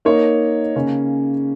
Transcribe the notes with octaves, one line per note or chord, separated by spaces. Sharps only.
A#3 D#4 A#4 C#5
C#3 A#3 C#4